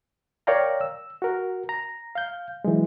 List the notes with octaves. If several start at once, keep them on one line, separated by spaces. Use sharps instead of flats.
A#4 C#5 D5 F5 G5 A#5
E6
F#4 A#4
A#5
F5 G6
E3 F#3 G#3